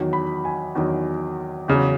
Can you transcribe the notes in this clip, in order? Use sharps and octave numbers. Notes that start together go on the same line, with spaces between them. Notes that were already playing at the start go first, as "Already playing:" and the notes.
Already playing: E2 D#3 F#3
B5
G#5
E2 D#3 F#3
E2 C#3 F#3